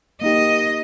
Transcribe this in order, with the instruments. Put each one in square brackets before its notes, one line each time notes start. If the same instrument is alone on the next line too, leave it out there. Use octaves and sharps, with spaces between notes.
[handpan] A#3 D#4 G4 [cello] D#5